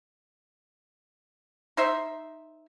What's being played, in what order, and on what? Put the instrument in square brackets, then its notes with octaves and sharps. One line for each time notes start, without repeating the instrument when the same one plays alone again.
[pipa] D#4 C5 E5